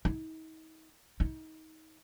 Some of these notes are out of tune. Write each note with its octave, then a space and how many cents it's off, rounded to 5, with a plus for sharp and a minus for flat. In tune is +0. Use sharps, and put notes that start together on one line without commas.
D#4 +40
D#4 +25